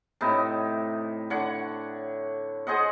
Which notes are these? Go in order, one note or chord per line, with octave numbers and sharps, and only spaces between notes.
A2 C3 D#4 E4
D3 C#5 F#5
G#4 C5 D#5 F#5